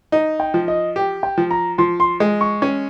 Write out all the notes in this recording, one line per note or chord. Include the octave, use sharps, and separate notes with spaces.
D#4
G5
F3
D#5
G4
G5
F3
A#5
F3 C6
C6
G#3
C#6
C#4